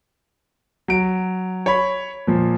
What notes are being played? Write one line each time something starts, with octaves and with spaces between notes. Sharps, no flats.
F#3 D7
C#5 B5
A#2 F3